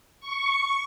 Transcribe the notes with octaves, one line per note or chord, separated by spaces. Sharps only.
C#6